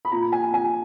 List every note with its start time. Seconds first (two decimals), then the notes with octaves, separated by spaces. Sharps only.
0.05 B5
0.12 A#2 A#5
0.32 G#5
0.54 G#5